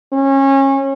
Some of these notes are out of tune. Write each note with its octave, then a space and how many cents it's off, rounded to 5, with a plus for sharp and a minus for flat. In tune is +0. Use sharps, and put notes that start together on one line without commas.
C#4 -30